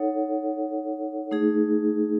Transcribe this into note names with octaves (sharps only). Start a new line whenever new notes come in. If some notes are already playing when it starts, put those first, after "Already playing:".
Already playing: D#4 A4 C#5 F#5
A3 D#4 G#4